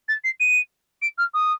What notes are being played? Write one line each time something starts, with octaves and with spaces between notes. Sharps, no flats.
A6
C7
D#7
D7
F6
D#6